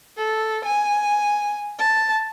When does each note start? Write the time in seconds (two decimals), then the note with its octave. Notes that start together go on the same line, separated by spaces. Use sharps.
0.17 A4
0.65 G#5
1.79 A5